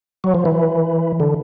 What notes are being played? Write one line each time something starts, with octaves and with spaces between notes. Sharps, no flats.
F#3
F3
E3
D3